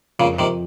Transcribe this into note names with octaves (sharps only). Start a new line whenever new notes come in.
F2 A#2 C#3
F2 C3 D#3